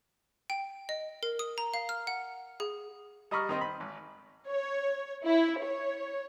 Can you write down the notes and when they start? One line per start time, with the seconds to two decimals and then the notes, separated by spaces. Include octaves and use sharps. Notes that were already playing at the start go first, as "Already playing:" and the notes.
0.50 G5
0.89 D#5
1.23 A#4
1.39 D#6
1.58 A#5
1.74 F5
1.89 F6
2.07 F#5
2.60 G#4
3.31 G3 D#5 A#5 B5 C#6 F6
3.49 D#3 C4 D#5
3.61 B5
3.80 G#1
4.50 C#5
5.26 E4
5.62 C#5